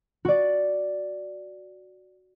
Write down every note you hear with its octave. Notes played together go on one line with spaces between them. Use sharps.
F#4 D5